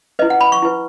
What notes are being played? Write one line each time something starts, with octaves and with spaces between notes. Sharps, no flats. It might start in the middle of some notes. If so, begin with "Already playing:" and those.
E4 B4 D#5
F#5
B5
C#6
E4 B4